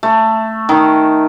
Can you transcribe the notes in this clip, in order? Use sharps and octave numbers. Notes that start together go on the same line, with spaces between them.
A3
D#3